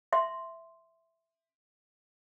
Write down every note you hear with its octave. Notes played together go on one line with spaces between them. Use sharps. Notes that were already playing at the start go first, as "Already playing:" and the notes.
E5 C6